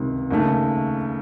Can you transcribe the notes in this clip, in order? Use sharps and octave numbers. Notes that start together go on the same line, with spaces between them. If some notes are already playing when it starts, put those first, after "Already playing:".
Already playing: C#2 C3 D#3
D#2 C#3 A3 D#4